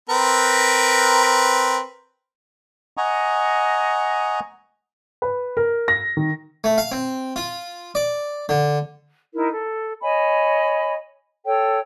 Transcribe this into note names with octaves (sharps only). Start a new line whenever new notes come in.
C4 A#4 B4
D#5 F#5 G#5 A#5 C#6 D#6
B4
A#4
A#6
D#3
A3
F5
C4
F4
D5
D3
D#4 E4 A#4
A4
C#5 D#5 G#5 B5
A4 C#5 G5